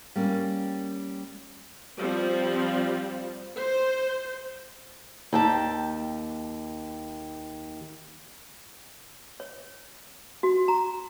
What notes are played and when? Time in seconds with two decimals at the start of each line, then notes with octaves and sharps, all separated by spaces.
0.16 G3 A#3 C#4
2.00 F3 G3 C4
3.58 C5
5.33 D#2 G5 A5
9.40 C#5
10.43 F#4
10.68 A#5